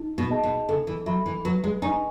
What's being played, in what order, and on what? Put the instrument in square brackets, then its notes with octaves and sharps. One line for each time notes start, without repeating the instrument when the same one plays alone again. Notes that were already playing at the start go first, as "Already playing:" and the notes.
Already playing: [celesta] D#4
[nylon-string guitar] B2
[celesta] G#4 D#5 A5
[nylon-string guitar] B2
[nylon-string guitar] C#3 [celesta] A4
[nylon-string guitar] E3
[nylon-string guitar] F#3 [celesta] E5 B5
[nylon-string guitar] E3
[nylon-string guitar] F#3 [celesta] B4
[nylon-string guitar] G#3
[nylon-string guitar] D#4 [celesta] D#5 G#5 C#6